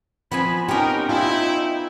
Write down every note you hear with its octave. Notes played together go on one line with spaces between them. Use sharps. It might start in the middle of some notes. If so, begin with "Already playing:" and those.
F3 B3 C4 G#5 B5
B3 C#4 D#4 G4 A#4 G5
E4 F4